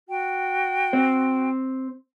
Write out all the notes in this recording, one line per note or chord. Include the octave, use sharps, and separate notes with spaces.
F#4 G5
C4 C5